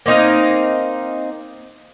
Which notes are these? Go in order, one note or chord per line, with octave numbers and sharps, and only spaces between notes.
A#3 C4 D#4 F5